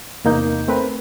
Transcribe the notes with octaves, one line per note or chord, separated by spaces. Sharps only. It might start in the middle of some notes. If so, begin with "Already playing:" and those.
E2 C3 A#3 D#4 G6
A3 C4 A#4 B4